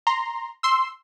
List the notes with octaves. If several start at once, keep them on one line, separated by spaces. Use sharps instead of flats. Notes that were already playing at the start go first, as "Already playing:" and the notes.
A#5 C6
C6 E6